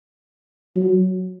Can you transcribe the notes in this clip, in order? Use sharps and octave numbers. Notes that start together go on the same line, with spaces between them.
F#3